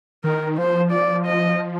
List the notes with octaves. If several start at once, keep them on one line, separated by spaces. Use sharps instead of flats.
D#3 A#4
F3 C5
D5
D#5